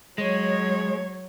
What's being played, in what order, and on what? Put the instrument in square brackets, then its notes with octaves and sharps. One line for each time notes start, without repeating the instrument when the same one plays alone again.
[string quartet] F#3 C#5 [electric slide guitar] G#3